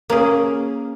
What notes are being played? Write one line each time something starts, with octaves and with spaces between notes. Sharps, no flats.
A#3 C#4 G#4